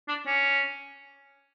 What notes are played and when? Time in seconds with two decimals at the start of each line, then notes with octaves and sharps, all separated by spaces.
0.08 D4
0.26 C#4